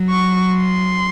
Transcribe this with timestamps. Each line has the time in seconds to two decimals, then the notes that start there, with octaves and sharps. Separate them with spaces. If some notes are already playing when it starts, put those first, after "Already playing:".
Already playing: F#3
0.10 C#6
0.57 C6